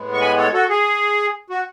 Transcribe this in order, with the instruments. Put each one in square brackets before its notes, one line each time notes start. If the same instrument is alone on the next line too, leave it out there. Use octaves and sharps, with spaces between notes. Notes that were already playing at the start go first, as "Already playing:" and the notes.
Already playing: [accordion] A2 G#3 B3
C#6
G#5 B5
A4 C#5
F#4 A4
G#4
F#4